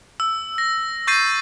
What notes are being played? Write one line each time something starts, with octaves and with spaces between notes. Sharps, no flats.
E6
A#6
C#6 G6 A6 C7 D#7